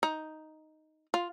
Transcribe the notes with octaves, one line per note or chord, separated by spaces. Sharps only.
D#4
F4